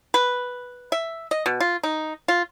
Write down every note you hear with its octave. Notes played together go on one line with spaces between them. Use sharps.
B4
E5
D#5
B2
F4
D#4
F4